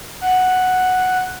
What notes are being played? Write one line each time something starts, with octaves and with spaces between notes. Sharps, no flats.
F#5